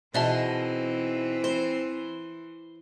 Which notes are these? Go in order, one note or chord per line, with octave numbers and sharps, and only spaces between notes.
B2 E3 C4 D#4 G#4 D5 E5 A5
C5